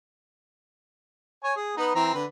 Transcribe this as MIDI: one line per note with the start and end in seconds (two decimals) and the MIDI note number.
1.44 1.53 73
1.44 1.53 80
1.56 1.75 68
1.77 1.94 59
1.77 1.94 63
1.77 1.94 71
1.95 2.14 52
1.95 2.14 60
1.95 2.14 82
2.14 2.25 50
2.14 2.25 71